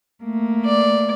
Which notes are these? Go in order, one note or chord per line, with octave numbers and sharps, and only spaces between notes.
A3 A#3
D5